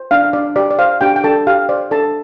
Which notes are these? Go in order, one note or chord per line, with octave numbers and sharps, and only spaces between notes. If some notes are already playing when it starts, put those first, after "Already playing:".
Already playing: C5
D4 F5
D4 D5
G4 D5
D5
C5 F5
D4 G4 G5
G5
D4 A4 A5
G4 F5
C5 D5
D4 A4 A5